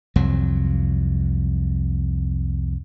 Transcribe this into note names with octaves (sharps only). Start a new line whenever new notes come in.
C2 F2 F#3